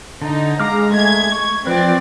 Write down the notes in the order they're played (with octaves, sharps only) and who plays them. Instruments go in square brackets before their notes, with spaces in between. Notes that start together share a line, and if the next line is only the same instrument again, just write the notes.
[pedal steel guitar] D3 [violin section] D#4
[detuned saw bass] G#3 [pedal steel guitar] F5 D6 F6 [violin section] A#5
[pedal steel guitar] A3 [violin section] G#6
[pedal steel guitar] C#6
[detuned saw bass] F3 [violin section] C4 D5 [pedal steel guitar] B4 G5